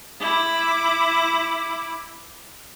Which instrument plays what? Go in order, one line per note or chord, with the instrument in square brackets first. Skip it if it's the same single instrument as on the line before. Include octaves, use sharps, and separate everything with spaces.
[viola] E4 D6